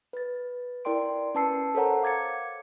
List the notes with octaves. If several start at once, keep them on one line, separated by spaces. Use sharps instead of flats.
B4 A6
E4 A#4 D5 G5 C6 D7
C#4 B4 A5 E6 C7 C#7
A4 A#4 C5 C#5 F#5 A#5
F5 D6 G#6 A6 C#7